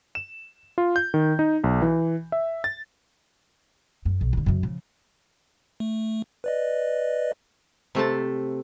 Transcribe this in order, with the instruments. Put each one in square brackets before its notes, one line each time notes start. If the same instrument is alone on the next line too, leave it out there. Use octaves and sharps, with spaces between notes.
[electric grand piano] E7
F4
G6
D#3
D#4
B1
E3
E5
A6
[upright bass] F#2
B1
D#2 D3
F#2 C#3
C#3 F3
[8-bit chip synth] A3
B4 D5 D#5
[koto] C3 A3 C4 A5